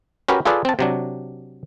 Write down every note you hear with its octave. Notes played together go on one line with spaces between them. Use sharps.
C#4 F#4 G4 A#4 B4
F4 G#4 A4 B4 D5
C4 A5
C3 F#3 D4